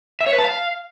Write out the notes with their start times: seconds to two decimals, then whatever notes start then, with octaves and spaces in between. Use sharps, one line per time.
0.21 E5
0.27 C#5
0.32 B4
0.38 A5
0.44 F5